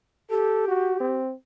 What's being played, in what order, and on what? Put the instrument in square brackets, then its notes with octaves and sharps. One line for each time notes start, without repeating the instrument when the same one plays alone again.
[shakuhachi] G4 [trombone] A4
[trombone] F#4
C4